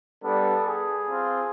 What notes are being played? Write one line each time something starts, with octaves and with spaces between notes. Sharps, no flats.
G3 B3 D4 A4
G#4
C4 F4